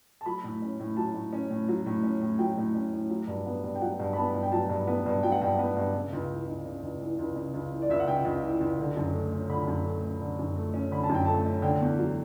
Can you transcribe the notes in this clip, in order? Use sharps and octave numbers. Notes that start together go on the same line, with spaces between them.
A5
F#3 B5
A2
C#4
A2
F#3 A5
A2
C#4
A2
F#3
A2
C#4
A2
F#3 G5
A2
C#4
A2
F#3
G2
B3
G2
G5
F#3 F#5
G2
B5
B3 A5
G2
G5
F#3 A5
G2
B3
G2
F#3 G5
F#5
G2 G5
B3
G2
C#3
C#2
E3
C#2
C#3
C#2
E3
C#2
C#3
C#2
E3
D5
C#2 E5
F#5
C#3 G5
C#2
E3
C#2
D3
F#2
A3
C#4
D3 B5
F#2
A3
C#4
D3
F#2
A3
C#4
D3 B5
A5
F#2
G5
A3 A5
C#4
D3 G5
E2
F#3